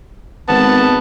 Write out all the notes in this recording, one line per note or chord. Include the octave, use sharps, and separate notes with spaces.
G#1 B3 A5